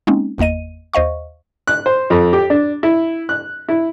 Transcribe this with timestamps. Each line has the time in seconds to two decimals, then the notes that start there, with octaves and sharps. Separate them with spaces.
0.07 G#3 A#3 C4 C#4 D#4
0.38 G1 E2 A#3 D#5 D#7
0.93 D#2 C5 D#5 F5 C#6
1.67 F#6
1.86 C5
2.10 F2
2.33 G4
2.50 D4
2.83 E4
3.29 F#6
3.68 E4